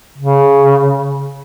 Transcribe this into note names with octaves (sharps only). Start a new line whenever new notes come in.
C#3